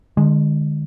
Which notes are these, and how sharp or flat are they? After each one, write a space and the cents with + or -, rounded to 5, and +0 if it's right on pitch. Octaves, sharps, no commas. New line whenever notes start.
D3 +45 G#3 +0